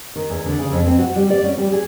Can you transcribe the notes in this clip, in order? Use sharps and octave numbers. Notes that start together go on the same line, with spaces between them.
D#3
E2
D3
C#3
F2
C4
F#4
G3
D5
C#4
G3
G#4